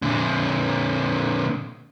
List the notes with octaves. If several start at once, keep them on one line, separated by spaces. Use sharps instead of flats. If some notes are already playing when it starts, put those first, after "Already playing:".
A#2 D3